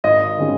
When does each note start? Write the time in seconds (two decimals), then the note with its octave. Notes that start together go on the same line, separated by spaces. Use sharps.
0.04 G#1 D#5
0.38 D#3 G#3 C#4